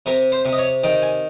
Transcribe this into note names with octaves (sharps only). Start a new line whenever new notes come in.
C3 A#4
C5
C3
D#5
C#5
D#3 G5
G#5